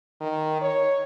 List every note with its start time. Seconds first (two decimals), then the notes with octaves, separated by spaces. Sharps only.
0.21 D#3
0.62 C#5